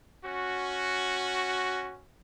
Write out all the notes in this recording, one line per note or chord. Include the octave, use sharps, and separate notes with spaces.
C#4 F#4